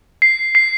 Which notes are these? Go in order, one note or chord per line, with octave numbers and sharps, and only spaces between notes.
C7
C7